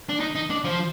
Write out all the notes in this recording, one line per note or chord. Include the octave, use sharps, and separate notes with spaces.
D4
D#4
D#4
D4
F3